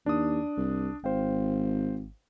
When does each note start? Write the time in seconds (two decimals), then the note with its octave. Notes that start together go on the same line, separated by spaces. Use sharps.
0.06 D#2 D4 D#6
0.58 C2
1.04 G#1 C5 F5 G5